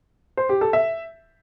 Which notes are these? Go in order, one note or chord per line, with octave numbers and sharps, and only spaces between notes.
C5
G4
A4
E5